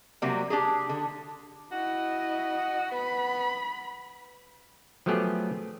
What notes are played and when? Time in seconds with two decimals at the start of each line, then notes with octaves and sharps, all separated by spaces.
0.22 C3 F#3 G3 A#3
0.50 D4 G4 G#4
0.89 D3
1.72 E4 F#4 D#5
2.91 B3 B5
5.06 F3 F#3 A3 B3 G4 G#4